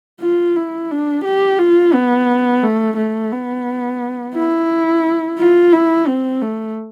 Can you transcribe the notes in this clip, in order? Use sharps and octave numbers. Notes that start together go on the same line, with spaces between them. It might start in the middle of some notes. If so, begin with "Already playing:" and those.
F4
E4
D4
G4
F4
B3
A3
A3
B3
E4
F4
E4
C4
A3